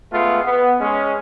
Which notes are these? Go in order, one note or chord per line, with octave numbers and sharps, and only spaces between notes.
G#3 A3 B3 F4
B3
G#3 C#4